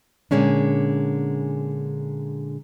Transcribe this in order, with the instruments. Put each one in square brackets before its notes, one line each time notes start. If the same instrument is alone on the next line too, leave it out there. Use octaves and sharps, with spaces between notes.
[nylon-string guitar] A#2 D3 G#3 C#4 D4